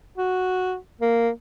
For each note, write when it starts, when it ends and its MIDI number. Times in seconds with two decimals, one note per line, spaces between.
0.18 0.76 66
1.01 1.31 58